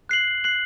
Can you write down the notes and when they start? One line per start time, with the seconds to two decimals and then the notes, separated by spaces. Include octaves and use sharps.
0.09 F#6 C7 F#7
0.44 F#6 C7 F#7